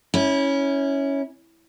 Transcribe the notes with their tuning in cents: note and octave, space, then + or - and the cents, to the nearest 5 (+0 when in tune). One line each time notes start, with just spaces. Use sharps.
C#4 +0 E4 -25